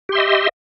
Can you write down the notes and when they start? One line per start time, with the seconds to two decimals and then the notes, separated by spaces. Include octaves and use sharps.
0.09 G4
0.12 C6
0.15 E5
0.18 D#5